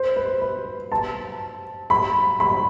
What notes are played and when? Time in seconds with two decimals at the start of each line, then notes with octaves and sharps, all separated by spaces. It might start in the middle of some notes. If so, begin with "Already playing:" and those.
Already playing: C5
0.16 B4
0.41 B4
0.92 A5
1.90 B5
2.40 B5